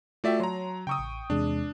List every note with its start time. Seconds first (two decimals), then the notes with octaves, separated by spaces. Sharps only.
0.24 A3 F4 F#4 D5 E5 G5
0.40 F#3 C#5 A5 A#5 C6
0.87 C#3 G5 A#5 C#6 D#6 E6
0.99 A1
1.30 E2 C3 G#3 D4